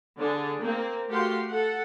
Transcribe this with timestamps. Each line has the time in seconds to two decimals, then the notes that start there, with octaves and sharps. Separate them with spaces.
0.18 D3 D4 G#4
0.61 A#3 C4
1.09 A3 F#4 G4 F5 C6
1.49 A4 F#5